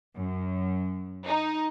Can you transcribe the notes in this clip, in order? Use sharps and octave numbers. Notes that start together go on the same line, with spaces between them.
F#2
D#4